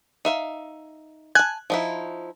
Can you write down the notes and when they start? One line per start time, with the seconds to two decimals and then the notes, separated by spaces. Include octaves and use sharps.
0.25 D#4 E5 F5
1.35 G#5 A5 F#6 G#6
1.70 F3 D#4 E4